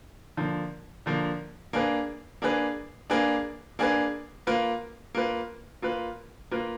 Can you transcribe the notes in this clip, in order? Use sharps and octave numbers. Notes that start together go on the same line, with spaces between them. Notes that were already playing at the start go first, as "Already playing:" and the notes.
D3 F3 A#3
D3 F3 A#3
A#3 D4 G#4 B4
A#3 D4 G#4 B4
A#3 D4 G#4 B4
A#3 D4 G#4 B4
A#3 F4 B4
A#3 F4 B4
A#3 F4 B4
A#3 F4 B4